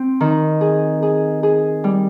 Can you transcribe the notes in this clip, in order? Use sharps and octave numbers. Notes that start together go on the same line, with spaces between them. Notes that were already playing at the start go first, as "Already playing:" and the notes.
Already playing: C4
D#3
G#4
G#4
G#4
G3